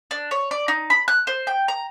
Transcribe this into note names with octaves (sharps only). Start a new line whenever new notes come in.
D4
C#5
D5
D#4
B5
F#6
C5
G5
A#5